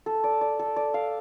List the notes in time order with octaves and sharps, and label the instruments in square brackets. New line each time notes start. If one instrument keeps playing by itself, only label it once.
[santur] A4
D5
D5
A4
D5
F5